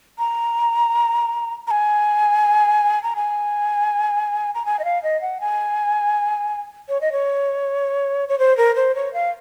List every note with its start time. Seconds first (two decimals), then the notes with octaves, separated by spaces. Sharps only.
0.19 A#5
1.67 A#5
1.71 G#5
3.03 A#5
3.16 G#5
4.55 A#5
4.66 G#5
4.79 D#5
4.84 F5
5.03 D#5
5.22 F#5
5.41 G#5
6.89 C#5
7.01 D#5
7.12 C#5
8.29 C#5
8.39 C5
8.57 A#4
8.76 C5
8.95 C#5
9.14 F5